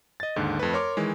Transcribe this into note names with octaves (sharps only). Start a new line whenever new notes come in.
D#5 A6
D#2 G#2 D3
F2 A3 B4
A#4 C#5 C6 D6
D#3 E3 G#3